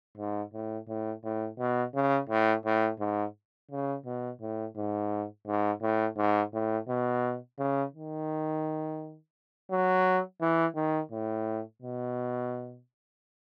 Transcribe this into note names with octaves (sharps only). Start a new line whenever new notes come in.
G#2
A2
A2
A2
B2
C#3
A2
A2
G#2
C#3
B2
A2
G#2
G#2
A2
G#2
A2
B2
C#3
D#3
F#3
E3
D#3
A2
B2